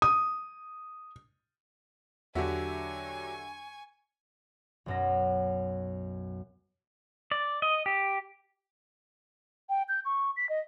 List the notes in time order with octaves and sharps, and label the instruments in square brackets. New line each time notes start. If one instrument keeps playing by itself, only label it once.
[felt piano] D#6
[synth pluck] E2 [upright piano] D3 F#4 E5 [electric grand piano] F#3 G4 [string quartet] G#5 C#6
[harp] B1 F#2 A#6
[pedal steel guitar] D5
D#5
G4
[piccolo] G5
G6
C#6
B6
D#5